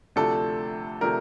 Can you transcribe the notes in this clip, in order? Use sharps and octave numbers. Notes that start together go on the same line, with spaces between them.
D2 C3 F3 A3 D4 A4
C3 F3 A3 D4 A#4